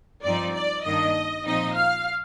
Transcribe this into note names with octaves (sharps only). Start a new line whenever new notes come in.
G2 F3 C4 D#4 D5
D5
G2 D#3 A#3 D4 D#5
A#2 F3 C4 D#4 D#5
F5